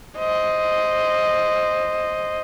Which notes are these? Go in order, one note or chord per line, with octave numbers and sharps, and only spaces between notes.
C5 D#5